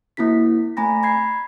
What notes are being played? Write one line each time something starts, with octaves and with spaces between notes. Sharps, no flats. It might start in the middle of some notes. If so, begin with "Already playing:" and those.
A#3 C4 E4 F#4 B6
A3 C4 G#5 A#5 B5 A#6
B5 G#6 C7